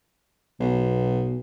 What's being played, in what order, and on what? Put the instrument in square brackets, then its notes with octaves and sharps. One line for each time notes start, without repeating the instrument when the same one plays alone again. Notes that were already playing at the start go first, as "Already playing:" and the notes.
[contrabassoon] B1 [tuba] B2